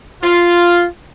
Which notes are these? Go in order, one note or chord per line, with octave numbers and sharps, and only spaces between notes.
F4